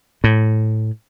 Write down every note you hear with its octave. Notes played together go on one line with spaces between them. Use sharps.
A2